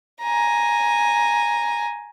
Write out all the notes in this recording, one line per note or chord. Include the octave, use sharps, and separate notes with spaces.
G#5 A#5